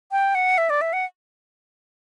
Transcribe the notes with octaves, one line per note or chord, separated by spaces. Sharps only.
G5
F#5
E5
D5
E5
F#5